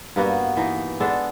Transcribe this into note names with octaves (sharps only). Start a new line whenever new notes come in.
G2 A#3 B3 F#4
E3 D#4
G#3 B3 D4 A4